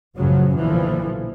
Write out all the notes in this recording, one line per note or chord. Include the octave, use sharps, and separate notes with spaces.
A1 F#2 C#3 F3 F#3
B1 A#2 D3 E3 F3